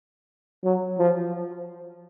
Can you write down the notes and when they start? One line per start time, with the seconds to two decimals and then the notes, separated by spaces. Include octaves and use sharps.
0.64 F#3
0.99 F3